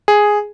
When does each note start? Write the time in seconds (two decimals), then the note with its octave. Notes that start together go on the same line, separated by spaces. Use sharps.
0.08 G#4